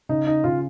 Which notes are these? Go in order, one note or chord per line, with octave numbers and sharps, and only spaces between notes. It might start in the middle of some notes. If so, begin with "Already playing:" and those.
C#3 D#4
D#4
C#3 F4